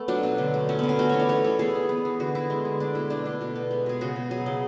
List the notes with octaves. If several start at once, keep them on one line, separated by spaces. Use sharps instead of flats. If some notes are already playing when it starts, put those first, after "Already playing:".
Already playing: A3 B3
F#3 D4
B2
D3
A3
F#3 C#4
D3 B3
C#4
A3 F#4
E3 C#5
D5
A3 C#5
E3 A4
B3 G#4
E3
B3
E3
D3 F#4
B3 E4
G#3
D3
A3 D4
B2 E4
A3 D4
B2 D4
B2
B3
G#3
B2 G#4
C#3 F#4
B3
F#3 G#4
C#3